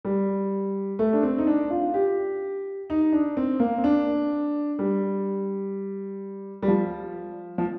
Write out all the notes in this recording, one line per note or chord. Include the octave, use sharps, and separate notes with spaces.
G3
A3
D4
C4
D#4
D4
F4
G4
D#4
D4
C4
A#3
C4
D4
G3
G3
F3
F3